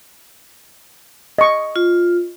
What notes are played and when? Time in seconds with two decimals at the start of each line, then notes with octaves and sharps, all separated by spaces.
1.38 D#5 C#6
1.76 F4